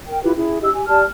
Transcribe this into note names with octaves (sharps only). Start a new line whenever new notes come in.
A#4 G5
E4 F4 G4 B4
C#4 E4 G#4
D4 G4 D#5 E6
G4 G#5
G4 D5 A5 F6